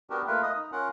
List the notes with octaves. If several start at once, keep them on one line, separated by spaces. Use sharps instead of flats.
B3 D4 F#4 G4 A#4
A3 A#3 F4 A#4 B4
D#5 D#6
D#4
C#4 F4 A#4 F#5